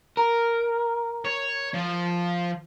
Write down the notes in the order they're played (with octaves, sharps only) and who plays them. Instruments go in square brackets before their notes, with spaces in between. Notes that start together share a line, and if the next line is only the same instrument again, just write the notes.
[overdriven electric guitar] A#4
[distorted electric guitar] C#5
F3